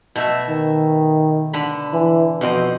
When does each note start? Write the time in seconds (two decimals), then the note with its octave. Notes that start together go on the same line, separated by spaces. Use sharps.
0.15 B2 A3 E5
0.49 D#3
1.53 D3 B5
1.93 E3
2.41 F2 B2 C4 D#5